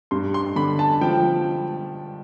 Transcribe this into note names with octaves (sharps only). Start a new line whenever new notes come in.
G2 C6
C6
D3 B5
A5
F3 G5